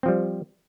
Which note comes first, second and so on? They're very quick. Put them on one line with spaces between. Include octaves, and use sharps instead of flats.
C4 F3 G3